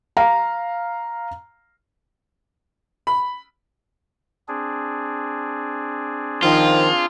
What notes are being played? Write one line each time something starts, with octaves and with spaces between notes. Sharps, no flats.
F5 A#5
B5
C4 D4 G#4
D#3 F3 F4